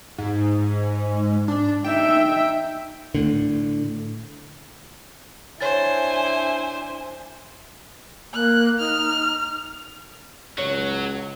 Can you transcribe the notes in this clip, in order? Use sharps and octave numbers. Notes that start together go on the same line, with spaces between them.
G#2
D4
D#4 E5 G5
A2 D3
D4 E4 C5 C#5 G#5 A6
A#3 F#6
D#4 F6
C#2 F#3 C#5